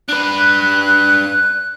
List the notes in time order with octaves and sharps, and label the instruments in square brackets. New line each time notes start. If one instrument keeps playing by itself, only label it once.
[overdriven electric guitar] D4 B4 [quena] F#6